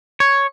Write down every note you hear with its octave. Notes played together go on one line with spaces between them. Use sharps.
C#5